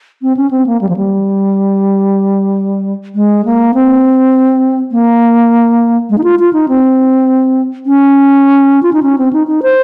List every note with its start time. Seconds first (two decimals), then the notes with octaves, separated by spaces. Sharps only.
0.22 C4
0.37 C#4
0.51 C4
0.66 A#3
0.81 G3
0.89 F3
0.97 G3
3.15 G#3
3.45 A#3
3.74 C4
4.92 A#3
6.10 G#3
6.18 D#4
6.24 F4
6.39 F4
6.53 D#4
6.68 C4
7.86 C#4
8.83 F4
8.93 D#4
9.03 C#4
9.18 C4
9.33 D#4
9.47 D#4
9.63 C5